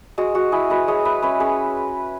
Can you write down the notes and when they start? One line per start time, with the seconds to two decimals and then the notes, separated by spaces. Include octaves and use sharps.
0.18 G#3 F#4
0.35 G#3 F#4
0.52 E4 G#4
0.70 G#3 F#4 B4
0.88 G#3 G#4 C#5
1.05 G#3 B4 E5
1.22 C#4 B4 E5
1.40 C#4 G#4 C#5